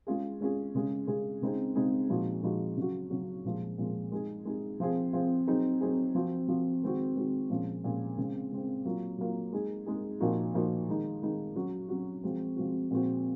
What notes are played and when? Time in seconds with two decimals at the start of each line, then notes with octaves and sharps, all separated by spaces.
0.07 G#3 C#4 F4 G#4
0.41 G#3 C#4 F4 G#4
0.75 C#3 G#3 C#4 G#4
1.07 C#3 G#3 C#4 G#4
1.42 C#3 G#3 C4 D#4 G#4
1.75 C#3 G#3 C4 D#4 G#4
2.09 A#2 F3 G#3 D#4 F#4
2.43 A#2 F3 G#3 D#4 F#4
2.77 C#3 F#3 C#4 F#4
3.10 C#3 F#3 C#4 F#4
3.44 A#2 F3 G#3
3.78 A#2 F3 G#3
4.12 G#3 D#4 G#4
4.45 G#3 D#4 G#4
4.80 F3 C4 F4 G#4
5.13 F3 C4 F4 G#4
5.47 F#3 C4 D#4 G#4
5.81 F#3 C4 D#4 G#4
6.15 F3 C4 F#4
6.48 F3 C4 F#4
6.82 D#3 G#3 C4 F#4
7.16 D#3 G#3 C4 F#4
7.50 A#2 F3 G#3 C#4
7.84 A#2 F3 G#3 C#4
8.17 C#3 G#3 C4
8.51 C#3 G#3 C4
8.85 F#3 A#3 F4
9.18 F#3 A#3 F4
9.53 G#3 D#4 G#4
9.86 G#3 D#4 G#4
10.20 A#2 F3 A#3 D#4 F#4
10.54 A#2 F3 A#3 D#4 F#4
10.88 D#3 G#3 D#4
11.22 D#3 G#3 D#4
11.56 F#3 C#4 F#4
11.89 F#3 C#4 F#4
12.23 F3 G#3 C4 F#4
12.56 F3 G#3 C4 F#4
12.91 A#2 F3 G#3 C4 F#4